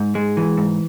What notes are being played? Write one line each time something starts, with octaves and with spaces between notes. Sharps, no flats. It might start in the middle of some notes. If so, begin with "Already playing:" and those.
Already playing: G#2
G#3
E3
G#2